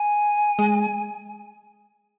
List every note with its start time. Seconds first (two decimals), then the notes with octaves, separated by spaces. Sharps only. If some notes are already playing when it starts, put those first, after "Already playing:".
Already playing: G#5
0.59 G#3